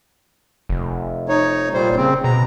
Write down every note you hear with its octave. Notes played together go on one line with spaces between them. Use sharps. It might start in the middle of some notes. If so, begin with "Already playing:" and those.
F1
D#4 C#5
A#2 G3 C5
C#3 C4
B2 A#5